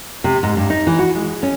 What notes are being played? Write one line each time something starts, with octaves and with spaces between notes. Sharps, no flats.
C3
G#2
G2
D#4
E3
F#4
G#3
C#4